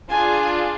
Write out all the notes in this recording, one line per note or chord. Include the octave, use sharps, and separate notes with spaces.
D4 F4 G#4 G#5